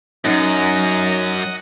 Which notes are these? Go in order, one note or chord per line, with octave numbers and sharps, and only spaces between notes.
F#2 F#3 C#4 D#4 D#5 F#5 A#6